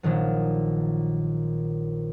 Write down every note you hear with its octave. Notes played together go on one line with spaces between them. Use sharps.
A#1 A#2 D#3 F#3